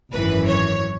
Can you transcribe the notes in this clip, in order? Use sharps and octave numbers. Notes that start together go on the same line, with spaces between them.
G#1 F#2 E3 B4
C#5